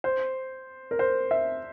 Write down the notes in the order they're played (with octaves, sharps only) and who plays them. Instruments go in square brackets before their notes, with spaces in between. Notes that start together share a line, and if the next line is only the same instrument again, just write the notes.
[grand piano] C5
A#4
C5
E5